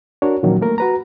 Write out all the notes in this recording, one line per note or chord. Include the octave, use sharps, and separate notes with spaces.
D4 F#4 A#4 C#5
A#2 D#3 F3 F#3 A#3 C#4
A3 A#3 A#4
F#4 B4 A#5